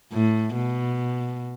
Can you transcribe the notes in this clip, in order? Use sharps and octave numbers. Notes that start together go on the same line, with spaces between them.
A2
B2